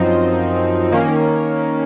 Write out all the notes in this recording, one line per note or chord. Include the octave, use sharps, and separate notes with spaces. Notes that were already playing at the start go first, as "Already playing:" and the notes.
Already playing: F#2 F3 C4 D#4
D#3 A#3 C#4